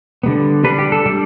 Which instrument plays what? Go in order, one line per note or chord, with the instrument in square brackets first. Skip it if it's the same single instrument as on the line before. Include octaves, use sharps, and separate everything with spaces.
[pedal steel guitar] D3 G3 B3
G3 D4 B4
G4
A4
G3 D4